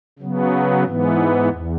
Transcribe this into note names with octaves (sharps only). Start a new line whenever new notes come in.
C#3 F#3 B3
G#2 E3 B3
E2